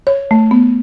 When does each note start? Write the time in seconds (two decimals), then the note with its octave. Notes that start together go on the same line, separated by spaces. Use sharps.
0.07 C#5
0.31 A3
0.51 B3